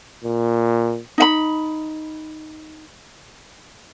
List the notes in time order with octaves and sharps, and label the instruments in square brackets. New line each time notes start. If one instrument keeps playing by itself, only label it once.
[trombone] A#2
[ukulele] D#4 E5 B5